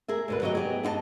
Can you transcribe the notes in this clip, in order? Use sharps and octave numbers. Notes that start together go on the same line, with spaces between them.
G#4 A#4 E5
D2 B2 B4
F#3 G4 D5 D#5
B3 G4 G#4
F#2 E4 G4 D#5 A5